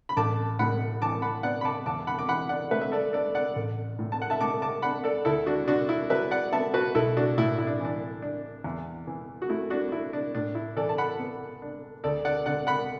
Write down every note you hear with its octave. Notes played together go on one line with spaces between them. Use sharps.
B5
A1 A5 D6
A2 F#5 B5
E3 A5 D6
F#5 B5
B3 D5 F#5
B5
A5 D6
E2 A5 D6
F#5 B5
D6
E3 F#5 B5
D5 F#5
A3 B4 E5
E5
A4 D5
D4 A4 D5
D5 F#5
A1
A2
A5
F#5
E5 A5
A3 A5 D6
A5 D6
D4 F#5 B5
A4 D5
D2 E4 A4
D4 F#4
D3 D4 F#4
E4
F#3 B4 E5
D5 F#5
B3 E5 A5
F#4 B4
B1 E4 A4
D4 F#4
A2 E4
E4
D4
E3 D4
D4
E2
E3
F#4
A3 E4
D4 F#4
D4 E4
D4
A2 D4
E4
E3 A4 D5
A5
F#5 B5
B3
D4
D2 A4 D5
D5 F#5
D3 D5 F#5
F#5 B5